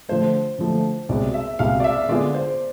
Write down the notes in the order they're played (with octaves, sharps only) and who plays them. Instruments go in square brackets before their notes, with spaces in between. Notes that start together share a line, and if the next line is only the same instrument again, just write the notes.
[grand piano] D3 F3 A3 [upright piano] C5
[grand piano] D3 F3 A3
[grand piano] C2 B2 G#3 [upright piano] D5
[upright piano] E5
[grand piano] C2 B2 G#3 [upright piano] F5
[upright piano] D5
E5
[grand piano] D3 G#3 B3 F4 G#4 [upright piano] D5
[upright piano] C5